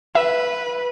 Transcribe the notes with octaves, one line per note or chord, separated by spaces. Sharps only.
B4 E5